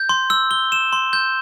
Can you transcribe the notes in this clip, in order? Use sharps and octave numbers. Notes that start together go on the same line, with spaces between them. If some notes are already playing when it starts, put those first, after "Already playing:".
Already playing: G6
C6
E6
G7
E7
C6
G6